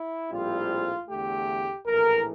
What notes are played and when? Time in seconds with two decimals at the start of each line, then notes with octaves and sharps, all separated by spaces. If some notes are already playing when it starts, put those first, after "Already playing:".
Already playing: E4
0.31 A#1 A2 G3 C4 F4
1.08 E2 D3 A3 G4
1.86 A#1 A2 E3 A#4